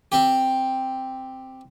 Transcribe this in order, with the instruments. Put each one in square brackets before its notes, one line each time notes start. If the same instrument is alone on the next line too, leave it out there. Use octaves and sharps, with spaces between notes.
[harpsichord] C4 G4